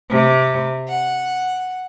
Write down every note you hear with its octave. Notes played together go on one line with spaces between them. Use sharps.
C3
F#5